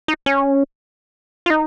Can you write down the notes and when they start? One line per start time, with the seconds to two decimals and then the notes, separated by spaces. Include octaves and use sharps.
0.08 D#4
0.26 C#4
1.46 F4
1.50 D#4